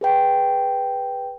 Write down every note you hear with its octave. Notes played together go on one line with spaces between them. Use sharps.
G#4 B4 G5